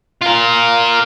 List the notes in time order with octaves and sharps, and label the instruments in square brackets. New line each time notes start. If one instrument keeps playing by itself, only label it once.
[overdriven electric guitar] F4 A#4